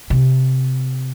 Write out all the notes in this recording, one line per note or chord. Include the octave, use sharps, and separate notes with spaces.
C3